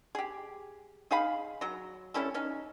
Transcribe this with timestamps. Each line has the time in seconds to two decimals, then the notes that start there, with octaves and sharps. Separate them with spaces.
0.15 G4 G#4
1.11 D#4 G#4 F5 B5
1.61 F#3 A#5
2.14 G3 C#4 E4 A4
2.34 C#4 D#4